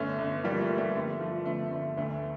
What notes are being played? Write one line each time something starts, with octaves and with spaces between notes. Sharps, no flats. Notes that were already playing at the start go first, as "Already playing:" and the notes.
Already playing: G1 A3 C#4
G1
F3 G3 A#3
A3
F3
G3
G1 A3
F3
G1 A3
G1 A3
D2 A3